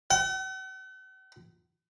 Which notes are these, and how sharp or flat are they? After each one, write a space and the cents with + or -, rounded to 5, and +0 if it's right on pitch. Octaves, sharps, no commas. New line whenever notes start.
F#5 +45